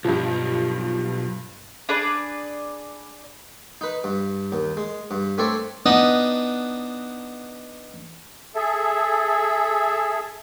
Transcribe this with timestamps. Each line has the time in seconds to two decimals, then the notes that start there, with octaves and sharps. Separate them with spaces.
0.04 B1 G2 F3
1.89 D4 G#4 B4 D5
3.81 D#4 B4
4.04 G2
4.52 D#2
4.77 G#3
5.11 G2
5.38 A3 C4 D4 A4 C#5 D5
5.86 B3 D4 D#4 D#5 F#5 G5
8.55 G#4 A4 E5